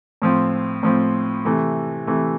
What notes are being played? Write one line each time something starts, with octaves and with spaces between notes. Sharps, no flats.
A2 F3 C4
A2 F3 C4
C3 E3 A3
C3 E3 A3